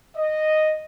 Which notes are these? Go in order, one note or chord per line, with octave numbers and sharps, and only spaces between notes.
D#5